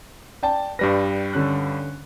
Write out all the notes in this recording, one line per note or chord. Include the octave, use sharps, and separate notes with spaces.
D5 G5 A5
G2 G3 B4 A#6
D3 C#4 F#6